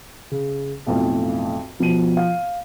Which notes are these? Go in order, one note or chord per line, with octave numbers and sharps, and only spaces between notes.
C#3
B1 F2 A2
B2 F3 D#7
F5